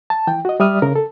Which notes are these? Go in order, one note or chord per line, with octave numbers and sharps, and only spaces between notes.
A5
E3 G5
F#4 D#5
G3 D5 E5 D#6 F6
C#3 A#4
A4